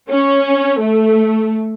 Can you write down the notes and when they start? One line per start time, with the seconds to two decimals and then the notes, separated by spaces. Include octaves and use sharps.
0.10 C#4
0.80 A3